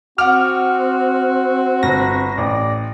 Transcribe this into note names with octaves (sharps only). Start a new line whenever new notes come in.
C4 F#4 F#5 D6 F6
G1 A#6
A1 D5